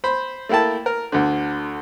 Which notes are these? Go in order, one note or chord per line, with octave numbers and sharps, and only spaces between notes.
C5 B5
A3 A#3 E4 G5 A5
A#4
D2 D3